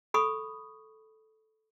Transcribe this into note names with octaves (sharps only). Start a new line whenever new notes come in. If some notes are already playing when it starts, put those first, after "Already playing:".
A4 B5 C#6 D#6